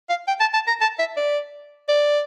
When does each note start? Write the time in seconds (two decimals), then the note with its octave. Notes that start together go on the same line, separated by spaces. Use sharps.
0.09 F5
0.28 G5
0.40 A5
0.54 A5
0.67 A#5
0.81 A5
0.99 E5
1.17 D5
1.89 D5